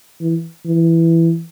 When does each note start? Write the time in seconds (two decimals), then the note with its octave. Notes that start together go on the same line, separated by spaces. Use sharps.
0.21 E3
0.65 E3